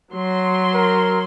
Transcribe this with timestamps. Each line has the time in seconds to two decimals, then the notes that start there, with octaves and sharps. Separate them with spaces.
0.13 F#3 C6
0.74 A#4